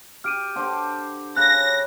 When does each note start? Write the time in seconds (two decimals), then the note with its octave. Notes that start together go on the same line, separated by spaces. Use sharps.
0.24 G4 F6 D7 D#7
0.55 D3 G4 C5
1.37 C#3 F#6 A#6